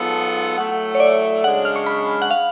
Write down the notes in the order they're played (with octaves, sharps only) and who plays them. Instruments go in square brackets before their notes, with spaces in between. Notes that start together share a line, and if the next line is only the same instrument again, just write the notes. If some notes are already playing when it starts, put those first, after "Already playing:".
Already playing: [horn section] G#2 F#3 B3 F4 A4 [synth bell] A5
[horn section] A2 F#3 A3 [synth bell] F#5
[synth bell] C#5
D5
[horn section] F#2 C#3 G#3 D4 [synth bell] F#5
[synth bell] F6
C#6
B5
F#5
F5